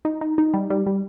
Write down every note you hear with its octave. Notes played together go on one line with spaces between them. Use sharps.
D#4
D#4
D#4
G3
G3
G3